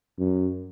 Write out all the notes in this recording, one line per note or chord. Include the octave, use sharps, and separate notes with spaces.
F#2